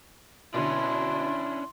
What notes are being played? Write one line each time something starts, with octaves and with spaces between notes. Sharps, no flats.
B2 D3 C#4 D4 E4 C6